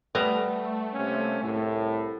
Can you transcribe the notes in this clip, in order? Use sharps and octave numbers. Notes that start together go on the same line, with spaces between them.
G3 A3 B3 A#5
C3 A#3 C#4
C2 A2